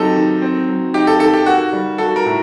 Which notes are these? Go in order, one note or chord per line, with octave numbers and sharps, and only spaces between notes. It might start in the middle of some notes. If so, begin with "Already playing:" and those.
Already playing: F#3 C4 D#4 G4 A4
D#3
C4
F#3
D#4 G4
A4
D#3 A4
G4
A#3 F#4
G3
F#4 A4
A#4
A2